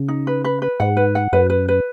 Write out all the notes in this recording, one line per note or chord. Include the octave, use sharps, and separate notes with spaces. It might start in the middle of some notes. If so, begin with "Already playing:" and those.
Already playing: C#3
D#4
B4
B4
B4
G#2 F#5
B4
F#5
F#2 B4
B4
B4